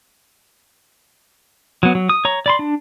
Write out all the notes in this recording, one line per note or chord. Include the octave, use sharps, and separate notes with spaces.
F#3 B3
F#3
D#6
C#5 A#5
D5 B5 C6
D4